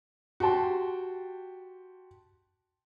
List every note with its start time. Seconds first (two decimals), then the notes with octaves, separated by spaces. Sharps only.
0.40 F#4 G4 G5 A5 C6